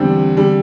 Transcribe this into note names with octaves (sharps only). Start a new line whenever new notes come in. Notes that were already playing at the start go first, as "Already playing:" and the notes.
Already playing: E2 D3 G3 C4
D3 G3